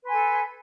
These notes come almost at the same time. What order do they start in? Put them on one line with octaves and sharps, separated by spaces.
B4 C6 G#5 A4